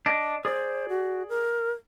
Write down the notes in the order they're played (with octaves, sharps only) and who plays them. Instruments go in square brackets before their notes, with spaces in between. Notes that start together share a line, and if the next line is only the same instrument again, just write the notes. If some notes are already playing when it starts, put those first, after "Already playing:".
[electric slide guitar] D4 D#5
[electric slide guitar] G#4 D5 [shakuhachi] C5
[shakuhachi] F#4
A#4